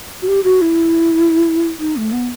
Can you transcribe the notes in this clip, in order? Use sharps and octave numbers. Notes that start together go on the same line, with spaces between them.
F#4
G4
F#4
E4
D#4
A3
B3